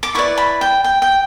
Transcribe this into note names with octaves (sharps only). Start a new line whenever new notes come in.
D6
E4 B4 D5 C#6
B5
G5
G5
G5